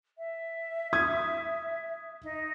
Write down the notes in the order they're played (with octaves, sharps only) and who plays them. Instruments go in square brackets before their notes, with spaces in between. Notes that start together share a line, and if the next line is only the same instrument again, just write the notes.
[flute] E5
[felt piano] D#6 G#6
[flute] D#4